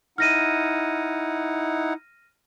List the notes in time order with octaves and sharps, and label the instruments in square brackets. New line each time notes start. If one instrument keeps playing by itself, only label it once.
[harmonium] D#4 E4 F#5 [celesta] F6 A#6 D#7